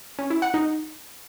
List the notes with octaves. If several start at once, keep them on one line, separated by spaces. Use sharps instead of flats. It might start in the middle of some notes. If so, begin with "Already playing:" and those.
C#4
E4
F#5
D#4